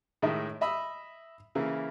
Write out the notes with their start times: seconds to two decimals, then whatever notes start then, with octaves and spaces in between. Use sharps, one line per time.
0.22 A2 D#3 G#3 D#5 E5
0.61 D#5 E5 B5 D#6 E6
1.55 C#3 E3 A#3 E4